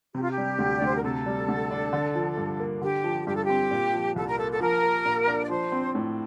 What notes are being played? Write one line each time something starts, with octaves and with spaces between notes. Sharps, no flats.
C3 G4
F4
G4
G3
D2
D5
D2 C5
A#4
C3 A4
G3
D2
D4
D3
F3
G2
A#3
D3 G4
F3
G2 G4
A4
G4
C4
A#2
F3
C2 A4
A#4
A#3 A4
A4
F3 A#4
A#3
A#2
D4
D5
F3 C5
C4
A2